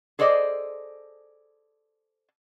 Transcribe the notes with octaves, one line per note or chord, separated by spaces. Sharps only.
G#4 A4 C5 D5 D#5